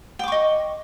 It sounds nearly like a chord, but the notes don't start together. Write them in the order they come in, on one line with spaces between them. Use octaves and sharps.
G5 D6 C#6 D#5